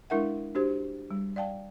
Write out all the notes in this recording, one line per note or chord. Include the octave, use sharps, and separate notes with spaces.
G#3 D4 E4 A#4 E5 F#5
D4 F#4 G4 C5
G3
D5 F5 G5 A5